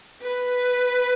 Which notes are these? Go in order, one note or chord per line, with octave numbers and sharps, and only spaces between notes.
B4